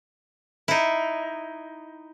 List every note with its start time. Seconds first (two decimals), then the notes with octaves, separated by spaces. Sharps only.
0.68 D#4 E4